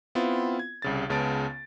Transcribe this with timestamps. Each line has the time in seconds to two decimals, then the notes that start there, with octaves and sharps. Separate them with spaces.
0.15 B3 C4 E4 F4
0.59 G#6
0.82 C2 C#3 A6
1.09 C#2 C#3 B3 A5 A6 D7